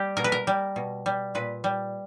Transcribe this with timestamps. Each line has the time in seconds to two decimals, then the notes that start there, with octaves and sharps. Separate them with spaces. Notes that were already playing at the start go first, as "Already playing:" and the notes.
Already playing: G3 G4
0.17 B2 A#4
0.24 B4
0.32 A#4
0.47 G3
0.76 B2
1.06 G3
1.35 A#2 B4
1.64 G3